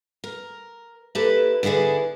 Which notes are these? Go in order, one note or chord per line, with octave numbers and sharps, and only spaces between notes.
A#4
A#3 E4 G4 A4 B4
D3 B3 E4 G#4 D5